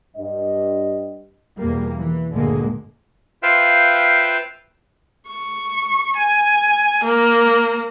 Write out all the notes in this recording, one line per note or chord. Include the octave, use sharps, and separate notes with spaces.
G2 D#5
E2 B2 G3 A#3
E3
D2 G2 A#2 D3 G#3 A#3
F4 B4 C5 E5 F5 G5
C#6
G#5
A#3